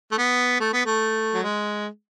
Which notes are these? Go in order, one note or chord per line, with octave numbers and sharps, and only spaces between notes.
A3
B3
A3
B3
A3
F#3
G#3